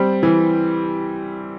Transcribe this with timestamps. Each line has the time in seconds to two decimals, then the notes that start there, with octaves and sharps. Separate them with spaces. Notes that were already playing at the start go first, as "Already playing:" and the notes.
Already playing: G3 C4
0.23 E3